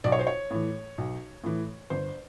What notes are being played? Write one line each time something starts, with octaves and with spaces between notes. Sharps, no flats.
B1 D5
C#5
C5
C#5
A2 E3
B1
A2 E3
G1 C5